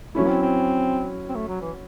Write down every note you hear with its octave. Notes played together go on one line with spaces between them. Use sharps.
F#3 A3 C#4 E4
C4
C4
C4
A3
F#3
E3